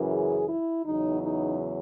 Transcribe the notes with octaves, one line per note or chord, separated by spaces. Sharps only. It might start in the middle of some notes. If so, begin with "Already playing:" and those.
Already playing: F#2 C#3 E3
G#4
E4
E2 C#3 F#3 D#4
D#4